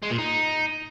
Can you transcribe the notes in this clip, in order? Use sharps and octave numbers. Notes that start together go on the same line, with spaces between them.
G#3
A#2
D#4